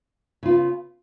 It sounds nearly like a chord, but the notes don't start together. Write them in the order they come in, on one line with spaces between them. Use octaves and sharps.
C#3 F4 B3